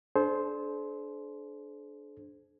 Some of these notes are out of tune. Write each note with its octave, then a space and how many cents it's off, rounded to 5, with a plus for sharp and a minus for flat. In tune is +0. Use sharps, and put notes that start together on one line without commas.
D4 +0 A4 -45 C5 +0